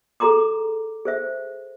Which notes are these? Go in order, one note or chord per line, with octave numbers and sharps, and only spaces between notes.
G#4 A4 A#5 C6 D6
G#4 C5 E5